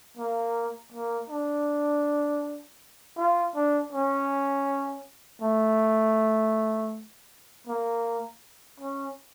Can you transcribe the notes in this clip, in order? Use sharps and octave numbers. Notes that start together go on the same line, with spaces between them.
A#3
A#3
D4
F4
D4
C#4
A3
A#3
C#4